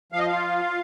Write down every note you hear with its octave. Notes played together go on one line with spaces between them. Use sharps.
F3 F5
D#5
F4 F5